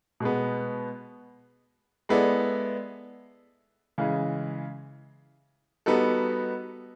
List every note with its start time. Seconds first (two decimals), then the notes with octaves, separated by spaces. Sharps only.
0.20 B2 G#3 B3
2.09 G#3 B3 E4 A4 D5
3.98 C#3 E3 G#3
5.86 G3 B3 D#4 F#4 A4